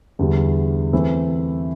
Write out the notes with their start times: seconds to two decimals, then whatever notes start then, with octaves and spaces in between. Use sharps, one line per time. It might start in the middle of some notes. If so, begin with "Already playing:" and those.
0.19 E2 D3 G3 D4 G4
0.93 E3 A3 C4